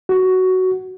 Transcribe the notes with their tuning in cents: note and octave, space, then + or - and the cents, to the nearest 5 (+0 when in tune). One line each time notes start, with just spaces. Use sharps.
F#4 +10